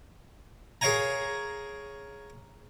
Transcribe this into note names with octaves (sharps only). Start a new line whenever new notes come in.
G#4 A#4 C#5 F5 G#5 A#5